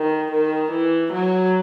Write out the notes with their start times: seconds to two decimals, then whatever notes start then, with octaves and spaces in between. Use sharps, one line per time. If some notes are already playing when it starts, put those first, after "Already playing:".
Already playing: D#3
0.32 D#3
0.71 E3
1.12 F#3